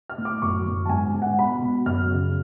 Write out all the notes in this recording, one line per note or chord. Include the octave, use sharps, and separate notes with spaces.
F6
A2
D6
F#2 C#6
F#2
A5
G#2 G#5
G#2
F#5
B2 B5
B2
F#2 F6
C#3